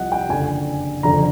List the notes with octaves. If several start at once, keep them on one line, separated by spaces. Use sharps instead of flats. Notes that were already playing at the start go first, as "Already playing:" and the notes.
Already playing: C2 C3 F3 D#5 F#5
G5
F#1 F2 D3 F3 G#5
F#1 F2 D3 F3 A#5